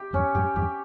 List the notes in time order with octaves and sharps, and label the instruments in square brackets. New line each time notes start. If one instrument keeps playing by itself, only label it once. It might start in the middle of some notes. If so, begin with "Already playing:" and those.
Already playing: [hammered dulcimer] G4
[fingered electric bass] E2 G2 [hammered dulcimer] C#4
[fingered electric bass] F#2 A2 [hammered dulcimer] G4
[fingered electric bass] E2 G2 [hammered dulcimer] G4